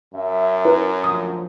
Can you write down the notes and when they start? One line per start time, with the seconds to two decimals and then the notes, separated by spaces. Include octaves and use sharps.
0.13 F#2 E5
0.65 C#4 E4 A#4 B4 A#5
1.04 D2 A#2 F3 D#6